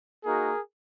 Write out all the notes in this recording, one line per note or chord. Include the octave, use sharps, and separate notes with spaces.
A#3 D#4 F#4 G#4 A#4